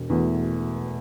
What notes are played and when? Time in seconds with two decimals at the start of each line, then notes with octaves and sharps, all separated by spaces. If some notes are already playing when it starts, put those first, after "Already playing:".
Already playing: E1
0.09 E2 B2 A3